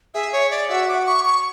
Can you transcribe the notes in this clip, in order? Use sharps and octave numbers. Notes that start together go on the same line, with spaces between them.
G#4 E5
C#5
D5
F#4 E5
D6
C#6
C#6